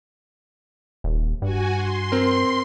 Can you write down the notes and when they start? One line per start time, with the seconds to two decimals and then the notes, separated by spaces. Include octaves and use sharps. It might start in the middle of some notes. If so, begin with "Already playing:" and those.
1.04 D#1
1.42 G2 F#4 G#5
1.74 C6
2.12 C4 A#4